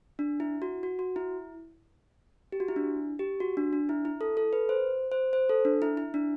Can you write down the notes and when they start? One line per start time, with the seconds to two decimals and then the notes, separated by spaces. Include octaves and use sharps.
0.19 D4
0.40 E4
0.62 F#4
0.83 F#4
0.99 F#4
1.16 E4
2.52 G4
2.60 F#4
2.68 E4
2.76 D4
3.19 G4
3.40 F#4
3.57 D4
3.73 D4
3.89 E4
4.05 E4
4.21 A4
4.37 A4
4.53 B4
4.69 C5
5.12 C5
5.33 C5
5.49 A4
5.65 D4
5.82 E4
5.97 E4
6.14 D4